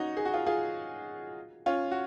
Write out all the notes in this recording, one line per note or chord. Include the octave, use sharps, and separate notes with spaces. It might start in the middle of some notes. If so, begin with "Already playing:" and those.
Already playing: C#4 D#4 F#4
G#4
F#4
F4 G#4
F4 G#4
C#4 F4
F#4